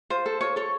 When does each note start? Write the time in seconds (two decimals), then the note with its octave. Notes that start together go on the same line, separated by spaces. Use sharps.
0.10 F4 C5
0.26 A4
0.41 F4 C#5
0.56 A4 C#5